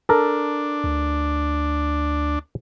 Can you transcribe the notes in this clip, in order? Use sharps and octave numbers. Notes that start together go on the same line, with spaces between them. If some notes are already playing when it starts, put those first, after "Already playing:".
D4 A4 A#4
D2